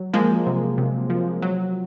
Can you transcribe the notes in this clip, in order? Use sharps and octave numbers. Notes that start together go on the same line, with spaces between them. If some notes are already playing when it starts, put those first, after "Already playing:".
Already playing: F#3
F3 G#3 A#3
C3
C3
F3
F#3